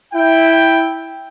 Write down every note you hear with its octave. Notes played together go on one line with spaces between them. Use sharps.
E4 G5